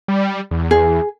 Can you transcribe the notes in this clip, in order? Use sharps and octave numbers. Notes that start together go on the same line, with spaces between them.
G3
E2
G#4